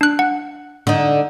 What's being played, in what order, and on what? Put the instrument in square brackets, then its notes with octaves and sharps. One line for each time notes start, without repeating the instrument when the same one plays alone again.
[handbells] D4 F#6
F#5
[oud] D3 D#4